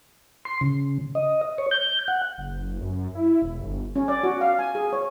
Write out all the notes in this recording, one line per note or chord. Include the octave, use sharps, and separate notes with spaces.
C6
C#3
D#5
C#5
G6
F#5
F#1
F#2
E4
E1
G1
C#4
D5
F#4
F5
G#5
G#4
C#5